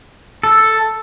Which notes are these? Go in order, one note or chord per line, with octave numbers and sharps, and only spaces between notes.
A4